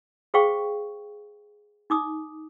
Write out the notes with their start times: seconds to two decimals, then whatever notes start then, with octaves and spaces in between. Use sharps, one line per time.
0.34 G#4 C5 F5 G5 C#6
1.90 D#4 D6 D#6